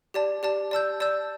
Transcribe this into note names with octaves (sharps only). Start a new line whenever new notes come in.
G4 D5 A5
G4 D5 A5
D5 A5 E6 G6
D5 A5 E6 G6